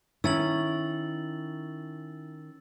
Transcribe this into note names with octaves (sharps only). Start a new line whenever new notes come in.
D#3 C#4 E4 E6 A6 F#7